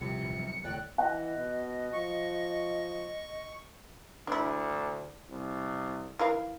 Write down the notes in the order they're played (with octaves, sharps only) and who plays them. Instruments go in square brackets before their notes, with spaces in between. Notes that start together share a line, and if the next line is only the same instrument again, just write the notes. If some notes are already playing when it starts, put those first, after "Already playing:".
[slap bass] D#1 [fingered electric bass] C2 F3 G3 [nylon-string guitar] C3 [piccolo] C#7
[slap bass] D#2 A#2 E3
F#2 D#3
[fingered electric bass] F#1 D#2 [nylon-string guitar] A2 D5 G5 [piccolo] F#6
[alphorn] E3 [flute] D#5 [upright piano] F#5
[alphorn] B2
[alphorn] F3 [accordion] C#6
[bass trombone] D2 [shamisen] D4 E4
[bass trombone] C2
[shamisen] E3 A#4 F5